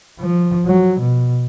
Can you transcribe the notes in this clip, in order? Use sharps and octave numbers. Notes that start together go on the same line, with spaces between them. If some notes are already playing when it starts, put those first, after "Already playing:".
F3
F#3
B2